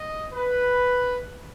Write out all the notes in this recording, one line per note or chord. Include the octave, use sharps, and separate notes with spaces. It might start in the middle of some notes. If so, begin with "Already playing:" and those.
Already playing: D#5
B4